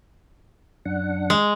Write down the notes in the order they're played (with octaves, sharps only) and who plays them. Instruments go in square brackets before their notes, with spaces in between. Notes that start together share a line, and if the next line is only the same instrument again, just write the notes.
[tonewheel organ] F#2 D4 F#5
[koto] G#3